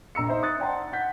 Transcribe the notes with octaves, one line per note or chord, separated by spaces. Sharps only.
A#1 A#5 E6 C#7
D#4 C5 E5
D#6 F#6 A6 C#7
D5 F#5 G5 A5 A#5 C6
F#5 G6 B6